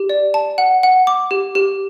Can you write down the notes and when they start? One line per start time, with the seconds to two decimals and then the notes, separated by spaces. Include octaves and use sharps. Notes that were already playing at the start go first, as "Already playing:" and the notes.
Already playing: G4
0.09 D5
0.34 A5
0.58 F#5
0.83 F#5
1.07 D6
1.31 G4
1.55 G4